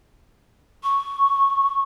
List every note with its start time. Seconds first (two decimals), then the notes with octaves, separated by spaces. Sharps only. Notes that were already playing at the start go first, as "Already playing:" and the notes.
0.84 C#6